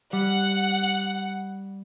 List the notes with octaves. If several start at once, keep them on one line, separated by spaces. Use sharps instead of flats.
G3 F#5